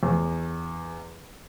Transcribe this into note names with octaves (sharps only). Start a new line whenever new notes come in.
E2